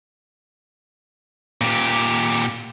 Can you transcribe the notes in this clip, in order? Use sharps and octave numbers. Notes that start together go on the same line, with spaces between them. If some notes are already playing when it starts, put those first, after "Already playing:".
A#2 G4